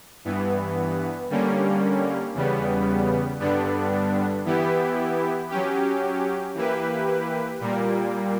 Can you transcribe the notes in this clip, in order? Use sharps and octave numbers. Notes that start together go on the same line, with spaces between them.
G2 E3 B3
D3 G3 A#3 C#4
E2 C#3 G3 B3
G2 D3 G3 B3 D4
E3 B3 E4 G4
F#3 C#4 G4
E3 A#3 E4 G4 B4
A#2 G3 A#3